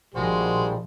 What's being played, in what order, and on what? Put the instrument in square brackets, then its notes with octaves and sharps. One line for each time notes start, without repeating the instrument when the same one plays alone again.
[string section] A#1 [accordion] D#3 F3 G3 [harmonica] G#3 [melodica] F#4 C5